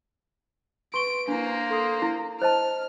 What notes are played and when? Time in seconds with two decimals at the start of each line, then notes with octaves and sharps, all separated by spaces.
0.94 B4 C6 C#6 D7 G7
1.28 A#3 D4 E4 C5
1.70 A4 C6 D#6
2.02 E4 A#5
2.42 C5 D#5 A5 F6